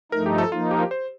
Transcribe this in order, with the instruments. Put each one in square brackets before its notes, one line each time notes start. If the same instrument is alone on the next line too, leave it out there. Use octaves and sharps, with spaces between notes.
[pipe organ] G2 F3 A3 D#4 [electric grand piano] A#4
[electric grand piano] G4
A4
[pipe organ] F3 A#3 D#4 [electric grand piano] F4
[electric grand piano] G4
C5